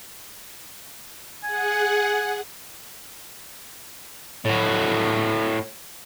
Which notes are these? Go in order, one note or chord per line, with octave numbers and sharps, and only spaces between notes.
G#4 F#5 G#5
A2 F#4